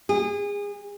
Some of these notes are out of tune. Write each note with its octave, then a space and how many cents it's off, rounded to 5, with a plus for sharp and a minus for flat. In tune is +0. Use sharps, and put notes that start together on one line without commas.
G#4 -30